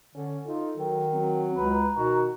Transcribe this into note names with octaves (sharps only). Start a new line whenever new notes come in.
D3 C#4
D#4 F4 A4
D#3 F#3
F#3 C4
C#2 B4 A#5
B2 D#3 F#4